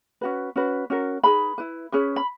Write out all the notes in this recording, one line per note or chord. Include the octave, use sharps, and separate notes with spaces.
C#4 F#4 B4
C#4 F#4 B4
C#4 F#4 A#4
D#4 G#4 B4 B5
E4 B4
C#4 G#4 B4
B5